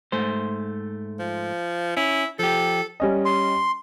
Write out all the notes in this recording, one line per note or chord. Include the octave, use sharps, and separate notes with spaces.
G#2 A3 C5
F3
C#4 E4
F3 G4 A4
G3 C#4 D#5
C6